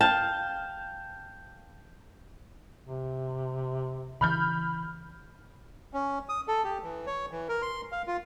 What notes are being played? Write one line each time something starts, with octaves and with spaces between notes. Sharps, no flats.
F5 G5 A5
C3
C#3 E3 B5 F6 G6
C#4
D#6
A4
G4
E3
C#5
E3
A#4
C6
F5
F4